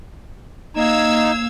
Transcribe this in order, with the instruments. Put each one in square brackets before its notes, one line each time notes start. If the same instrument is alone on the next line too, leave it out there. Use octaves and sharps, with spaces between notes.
[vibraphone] A#3 [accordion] D#4 [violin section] F5 E6 G#6